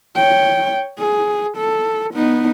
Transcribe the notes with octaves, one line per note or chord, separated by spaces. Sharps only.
C#5 G5
G#4
A4
B3 D#4